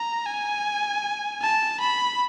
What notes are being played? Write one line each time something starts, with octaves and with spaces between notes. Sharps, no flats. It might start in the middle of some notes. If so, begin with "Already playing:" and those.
Already playing: A#5
G#5
A5
B5